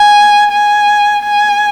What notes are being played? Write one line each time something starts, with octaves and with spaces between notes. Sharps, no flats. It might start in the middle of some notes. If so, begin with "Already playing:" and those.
Already playing: G#5
G#5
G#5